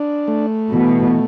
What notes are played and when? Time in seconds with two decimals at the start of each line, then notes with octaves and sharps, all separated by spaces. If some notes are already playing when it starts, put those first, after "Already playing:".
Already playing: D4
0.28 A3
0.73 B2 E3